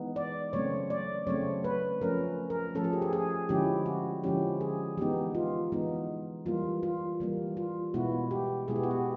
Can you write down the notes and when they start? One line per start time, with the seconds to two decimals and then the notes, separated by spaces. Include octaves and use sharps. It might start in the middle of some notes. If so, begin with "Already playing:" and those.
Already playing: E3 G#3 B3 D#4
0.16 D5
0.53 C#3 F#3 A3 C4 C#5
0.90 D5
1.27 C#3 F#3 A3 C4 C#5
1.64 B4
2.01 F3 A3 C#4 A#4
2.50 A#4
2.75 F3 A3 C#4 A4
2.84 G#4
2.93 G4
3.02 G#4
3.13 G#4
3.49 D3 F3 G#3 C#4 E4 G4
3.86 F#4
4.23 D3 F3 G#3 C#4 E4 G4
4.61 G#4
4.97 E3 G#3 B3 D#4 G4
5.35 F4
5.72 E3 G#3 B3 D#4
6.46 E3 G3 A#3 F4
6.83 F4
7.20 E3 G3 A#3
7.57 F4
7.94 B2 G#3 B3 E4 F#4
8.31 G4
8.68 B2 G#3 B3 E4 G#4
8.76 G4
8.84 F#4
8.91 G4